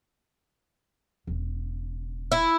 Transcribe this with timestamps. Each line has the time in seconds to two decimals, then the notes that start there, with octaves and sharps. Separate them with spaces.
1.27 E1 C#3
2.32 E4